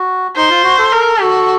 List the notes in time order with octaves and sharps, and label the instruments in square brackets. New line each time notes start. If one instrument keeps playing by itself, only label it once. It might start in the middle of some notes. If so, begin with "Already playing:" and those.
Already playing: [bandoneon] F#4
[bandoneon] D#4 [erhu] C5
[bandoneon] F4
F#4
A4
[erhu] A#4
[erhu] F#4 [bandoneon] A4